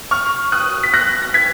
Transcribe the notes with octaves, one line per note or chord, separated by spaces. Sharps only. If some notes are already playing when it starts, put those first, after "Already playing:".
C#6 F6
D#6 F#6
B6
F#6 A#6
A#6
G#6 B6